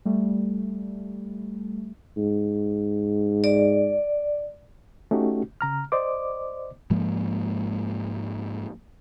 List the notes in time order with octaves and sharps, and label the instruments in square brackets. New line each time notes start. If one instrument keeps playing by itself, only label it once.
[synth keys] G3 A3
[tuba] G#2
[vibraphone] D5
[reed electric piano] A3 C#4 D#4 F#4 G4
C#3 A#5 F6
C5 D5 D#5 D6
[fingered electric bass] G#2 F3 G#3 A#3